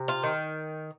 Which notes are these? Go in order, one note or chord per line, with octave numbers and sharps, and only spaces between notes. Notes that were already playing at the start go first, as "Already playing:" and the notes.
Already playing: C3
F4
D#3